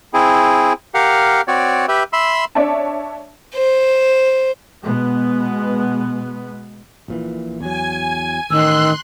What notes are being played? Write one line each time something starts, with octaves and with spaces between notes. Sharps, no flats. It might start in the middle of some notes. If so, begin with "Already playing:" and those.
C4 E4 G#4
G4 A#4 F5 F#5
C4 F#4 C#5 D5
G4 B4 E5
E5 B5 C6 E6
D4 C#5 D5 E5 A5
C5
B2 G#3 B3
A#1 A#2 E3
E2 F#3 G#5
A1 D#3 C6 E6 F#6